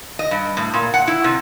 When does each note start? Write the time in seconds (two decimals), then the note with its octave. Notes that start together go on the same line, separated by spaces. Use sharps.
0.19 D#5
0.31 G2
0.57 A2
0.74 A#2
0.94 F#5
1.07 E4
1.24 C3